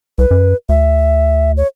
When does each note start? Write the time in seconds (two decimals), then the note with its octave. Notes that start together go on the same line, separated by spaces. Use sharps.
0.18 C2 B4
0.31 F#2
0.69 D2 E5
1.57 C#5